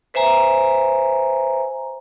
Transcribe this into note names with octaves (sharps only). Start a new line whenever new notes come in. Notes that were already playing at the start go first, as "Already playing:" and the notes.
B4 C5 E5 G#5 A#5